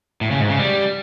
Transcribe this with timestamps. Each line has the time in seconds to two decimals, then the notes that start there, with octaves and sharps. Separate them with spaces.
0.21 A2
0.31 C#3
0.40 G#2
0.50 C#3
0.59 G3